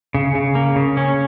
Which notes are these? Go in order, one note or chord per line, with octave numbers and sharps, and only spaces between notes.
C#3
C#3
A#3
C#3
C#4